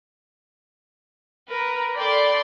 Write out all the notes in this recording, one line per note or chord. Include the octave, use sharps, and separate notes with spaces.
A#4 B4 A#5
A4 D5 G5 B5 C6 D6